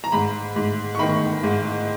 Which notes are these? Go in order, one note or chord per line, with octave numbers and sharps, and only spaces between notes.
A#5
G#2 B5
G#2
C#6
D#3 B5
G#2